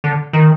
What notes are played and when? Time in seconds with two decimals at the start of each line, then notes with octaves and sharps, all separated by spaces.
0.04 D3
0.33 D#3